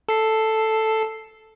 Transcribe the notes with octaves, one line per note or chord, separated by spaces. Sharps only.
A4 C7